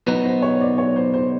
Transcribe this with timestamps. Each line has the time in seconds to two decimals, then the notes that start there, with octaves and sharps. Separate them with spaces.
0.07 B2 F#3 B3 D#4 B4
0.25 C5
0.42 C#5
0.61 D5
0.78 C#5
0.96 C5
1.14 C5